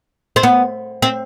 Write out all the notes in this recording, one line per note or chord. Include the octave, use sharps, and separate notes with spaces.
C4
B3
C4